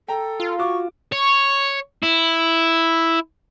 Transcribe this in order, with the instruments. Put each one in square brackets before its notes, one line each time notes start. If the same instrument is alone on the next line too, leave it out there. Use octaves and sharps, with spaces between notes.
[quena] A4 [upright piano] G5 A#5
[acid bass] F4
[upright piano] F#4 D6 [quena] C#6
[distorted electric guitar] C#5
E4